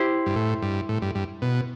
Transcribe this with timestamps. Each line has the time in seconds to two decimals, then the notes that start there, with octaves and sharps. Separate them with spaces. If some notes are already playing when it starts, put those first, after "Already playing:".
Already playing: E4 G4 C5
0.26 G2
0.36 A2
0.62 G2
0.89 A2
1.02 G2
1.15 G2
1.42 B2